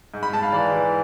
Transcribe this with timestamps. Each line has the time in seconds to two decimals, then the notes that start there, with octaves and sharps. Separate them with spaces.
0.14 G#2
0.23 B5
0.33 G#2 A5
0.43 F5
0.52 E3 D5
0.72 E3